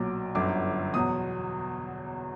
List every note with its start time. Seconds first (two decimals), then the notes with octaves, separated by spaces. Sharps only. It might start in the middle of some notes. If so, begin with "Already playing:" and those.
Already playing: B1 A#2 F#3 D6
0.35 G1 F#2 D3 F#3 D6
0.94 E2 B2 F#3 D#6